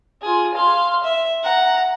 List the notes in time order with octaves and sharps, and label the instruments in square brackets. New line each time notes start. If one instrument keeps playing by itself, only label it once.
[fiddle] F4 G#4
F5 C6
E5
F#5 A#5